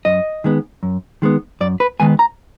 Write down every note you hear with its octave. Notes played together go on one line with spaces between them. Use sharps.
F#2 D#5
D#3 G#3 B3
F#2
D#3 G#3 B3
F#2 D5
B4
D#3 G#3 B3 G#5
A#5